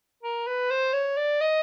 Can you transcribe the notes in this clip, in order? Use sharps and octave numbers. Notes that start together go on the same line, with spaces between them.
A#4
B4
C5
C#5
D5
D#5